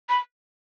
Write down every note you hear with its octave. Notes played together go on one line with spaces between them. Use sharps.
B5